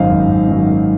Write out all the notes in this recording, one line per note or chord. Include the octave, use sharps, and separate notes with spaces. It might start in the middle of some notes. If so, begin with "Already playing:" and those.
Already playing: G#1 F#2 D#3 F#3 C5 D#5 F5
G#1
F#2 D#3 F#3